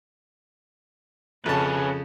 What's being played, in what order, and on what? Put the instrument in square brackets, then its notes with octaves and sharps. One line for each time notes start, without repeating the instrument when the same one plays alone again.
[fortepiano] F2 A5 [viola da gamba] C#3 [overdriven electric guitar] C#4 B4